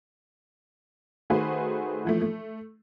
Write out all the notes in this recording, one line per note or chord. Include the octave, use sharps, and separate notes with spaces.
D#3 A3 F#4 G#4 B4 C5
E3 F3 A3
A3